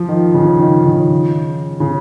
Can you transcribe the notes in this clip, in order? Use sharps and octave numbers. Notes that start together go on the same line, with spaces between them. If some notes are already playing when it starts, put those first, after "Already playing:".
Already playing: F3
D#3
C#3
D#3
C#3
C#3